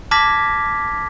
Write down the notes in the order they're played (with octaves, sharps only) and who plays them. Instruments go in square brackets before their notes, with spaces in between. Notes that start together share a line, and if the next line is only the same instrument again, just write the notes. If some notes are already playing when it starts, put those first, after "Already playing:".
[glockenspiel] A5 D6 F6 G#6 A#6 B6